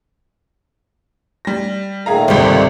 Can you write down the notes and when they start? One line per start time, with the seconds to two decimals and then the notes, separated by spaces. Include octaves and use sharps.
1.45 G3 A#6
2.06 A#2 D#3 A3 G#4 F5 A#5
2.28 G#1 C#2 C3 G3